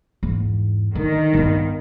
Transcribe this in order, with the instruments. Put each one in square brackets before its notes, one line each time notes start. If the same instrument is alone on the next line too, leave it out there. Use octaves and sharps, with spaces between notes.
[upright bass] E2 G#2
[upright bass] D3 [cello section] D#3
[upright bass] G2 B3